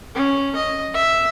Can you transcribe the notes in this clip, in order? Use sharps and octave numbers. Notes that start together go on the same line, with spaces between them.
C#4
D#5
E5